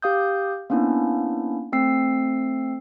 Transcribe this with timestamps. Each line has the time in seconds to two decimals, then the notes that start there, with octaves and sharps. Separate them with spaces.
0.02 G4 F5 D#6 G6
0.70 A#3 B3 C#4 D4 E4
1.72 A3 C4 E6 C7